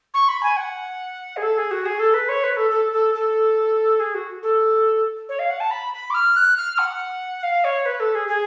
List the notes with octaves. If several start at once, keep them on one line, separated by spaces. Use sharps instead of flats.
C#6
B5
G#5
F#5
G#4
A4
G#4
F#4
G#4
A4
B4
C#5
B4
A4
A4
A4
A4
G#4
F#4
A4
C#5
F5
F#5
A5
B5
B5
D6
F6
F#6
F6
F#5
F5
C#5
B4
A4
G#4
G#4